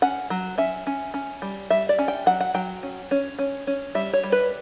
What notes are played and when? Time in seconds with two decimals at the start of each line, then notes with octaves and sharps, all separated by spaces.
0.02 C#4 F#5
0.30 F#3
0.58 C#4 E5
0.87 C#4
1.14 C#4
1.42 G3
1.70 G3 E5
1.89 D5
1.99 C#4
2.08 G5
2.26 F#3 F#5
2.41 F#5
2.54 F#3 G5
2.83 C#4
3.11 C#4
3.39 C#4
3.67 C#4
3.95 G3 E5
4.13 C#5
4.24 G3
4.32 B4